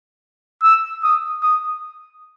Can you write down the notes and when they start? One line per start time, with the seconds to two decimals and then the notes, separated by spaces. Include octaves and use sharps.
0.63 E6
1.03 D#6
1.43 D#6